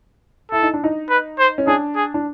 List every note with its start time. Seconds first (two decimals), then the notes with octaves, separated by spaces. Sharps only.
0.51 E4 A4
0.63 D#4
0.74 D4
0.84 D#4
1.09 B4
1.39 C5
1.58 C#4
1.67 D4 G#4
1.96 G#4
2.14 D4